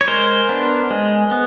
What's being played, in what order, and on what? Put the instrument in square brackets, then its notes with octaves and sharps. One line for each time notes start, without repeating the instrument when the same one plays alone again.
[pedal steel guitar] C#5
G#3 A#4 C5
B3 D4
G#3
B3